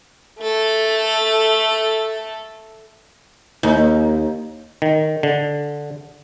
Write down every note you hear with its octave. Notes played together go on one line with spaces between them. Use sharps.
A3 A4
D#2
D#3
D3